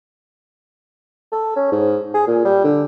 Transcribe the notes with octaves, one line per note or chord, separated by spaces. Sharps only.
A4
C#4
G#2
G#4
A#2
G3
D3